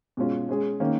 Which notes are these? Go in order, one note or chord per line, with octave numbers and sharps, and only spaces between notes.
B2 G#3 C#4 F4
G#3 C#4 G#4
D#3 A#3 C#4